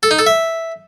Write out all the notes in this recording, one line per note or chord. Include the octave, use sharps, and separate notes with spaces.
A4
D#4
A4
E5